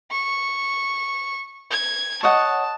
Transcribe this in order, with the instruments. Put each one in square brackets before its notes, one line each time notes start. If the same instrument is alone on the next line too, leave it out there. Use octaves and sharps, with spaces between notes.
[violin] C#6
G#6
[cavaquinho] C#5 D#5 F#5 [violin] A5